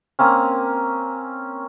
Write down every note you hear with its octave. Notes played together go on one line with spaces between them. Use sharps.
A#3 C4 C#4